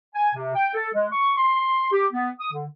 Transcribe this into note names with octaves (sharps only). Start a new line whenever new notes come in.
G#5
C3
G5
A4
G#3
C#6
C6
G4
B3
D#6
D3